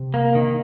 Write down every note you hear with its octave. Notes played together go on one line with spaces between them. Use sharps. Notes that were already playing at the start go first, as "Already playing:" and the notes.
Already playing: C3
A#3
D#3